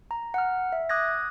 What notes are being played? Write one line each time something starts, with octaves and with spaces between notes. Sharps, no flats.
A#5
F#5 F6
E5
D6 D#6 F#6 G#6 A#6